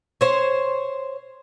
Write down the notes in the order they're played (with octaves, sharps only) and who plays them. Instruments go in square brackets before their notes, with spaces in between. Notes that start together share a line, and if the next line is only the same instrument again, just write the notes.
[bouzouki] C5 C#5